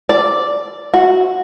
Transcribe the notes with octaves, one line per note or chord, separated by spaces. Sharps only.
D5
F#4